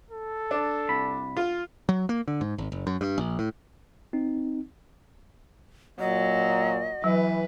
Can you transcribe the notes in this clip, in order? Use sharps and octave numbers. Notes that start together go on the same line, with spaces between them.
A4
D4
C2 B5
F4
F#3
A#3
D3
G#2
G#1
F#1
F#2
G2
A#1
A2
C4 D#4
A#2 F#3 D#5
E3 F#3 B4